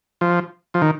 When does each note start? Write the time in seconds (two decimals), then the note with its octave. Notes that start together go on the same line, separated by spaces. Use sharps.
0.21 F3
0.74 F3
0.82 D#3